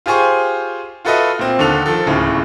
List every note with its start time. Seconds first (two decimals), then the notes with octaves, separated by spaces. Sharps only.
0.06 F4 G4 G#4 C5 G#5 C#6
1.05 F4 F#4 A4 B4 D#5 E5
1.39 A#2 C4
1.59 D#2 D3 A4 F7
1.86 D#3 F3 A4
2.07 D1 D#2 A2 C#3